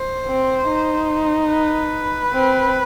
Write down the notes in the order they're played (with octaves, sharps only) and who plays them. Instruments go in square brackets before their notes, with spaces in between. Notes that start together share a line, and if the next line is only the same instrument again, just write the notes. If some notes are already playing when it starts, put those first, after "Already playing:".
Already playing: [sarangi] C5
[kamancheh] C4
D#4
[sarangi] B4
[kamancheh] C4